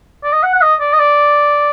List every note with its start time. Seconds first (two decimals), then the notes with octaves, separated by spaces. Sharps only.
0.24 D5
0.33 D#5
0.43 F#5
0.55 F#5
0.62 D#5
0.80 D5
0.93 D#5
0.99 D5